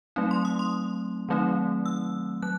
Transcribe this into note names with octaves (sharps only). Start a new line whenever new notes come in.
F#3 A3 C4 D#4
C6
D#6
C6
D#3 F#3 A3 C4 D#4
E6
F#3 F#6